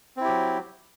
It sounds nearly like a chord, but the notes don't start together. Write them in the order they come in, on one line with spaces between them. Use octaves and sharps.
C4 E4 G4 F#3